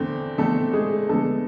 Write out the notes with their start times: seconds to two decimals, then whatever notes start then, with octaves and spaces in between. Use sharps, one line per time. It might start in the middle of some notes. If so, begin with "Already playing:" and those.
Already playing: E2 D3 A3 C4
0.38 E2 D3 A3 C4 A4
0.73 G#3 G#4
1.09 E2 D3 G#3 A3 B3 D4 A4